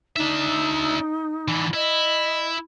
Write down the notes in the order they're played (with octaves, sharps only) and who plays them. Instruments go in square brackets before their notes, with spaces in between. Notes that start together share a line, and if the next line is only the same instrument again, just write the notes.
[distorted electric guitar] D4 E5 [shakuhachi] D#4
[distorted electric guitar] D3 E3
[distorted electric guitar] E4 [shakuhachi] D#5